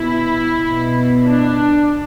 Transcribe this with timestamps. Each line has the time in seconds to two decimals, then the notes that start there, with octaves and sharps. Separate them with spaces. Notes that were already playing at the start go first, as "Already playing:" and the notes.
Already playing: B2 E4
0.66 B2
1.26 D4